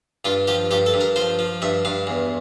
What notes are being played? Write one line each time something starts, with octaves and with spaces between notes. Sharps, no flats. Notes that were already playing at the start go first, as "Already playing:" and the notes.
G2 F4
F3 G4
G2 G4
A4
G2
A#4
F3 C5
F3
G2 E5
G2 F5
E2